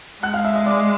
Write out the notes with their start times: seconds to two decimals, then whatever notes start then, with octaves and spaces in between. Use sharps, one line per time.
0.23 G#3 F#5 F#6
0.34 F5 F6
0.44 E5 E6
0.55 D#5 D#6
0.66 D5 D6